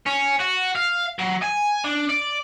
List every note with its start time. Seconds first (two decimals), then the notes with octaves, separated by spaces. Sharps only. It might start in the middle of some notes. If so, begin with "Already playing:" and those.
0.07 C#4
0.39 F#4
0.75 F5
1.19 F#3
1.42 G#5
1.84 D4
2.10 D5